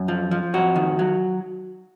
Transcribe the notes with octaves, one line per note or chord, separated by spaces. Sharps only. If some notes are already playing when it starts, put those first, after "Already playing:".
Already playing: F#2
F3
F3
F2 F#4
D#3
F#3